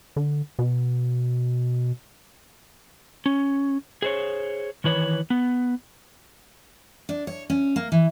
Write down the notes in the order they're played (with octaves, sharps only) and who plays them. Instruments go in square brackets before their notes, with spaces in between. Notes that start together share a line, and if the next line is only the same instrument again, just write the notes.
[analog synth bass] D3
B2
[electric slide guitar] C#4
G#4 C5 C#5
D#3 E3 B4 C#5
B3
[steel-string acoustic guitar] D4
C#5
C#4
A#3
E3